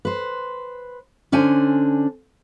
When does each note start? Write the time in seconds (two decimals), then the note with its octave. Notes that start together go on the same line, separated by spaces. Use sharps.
0.05 B4 C5
1.32 D3 C#4 D4 C5 G#5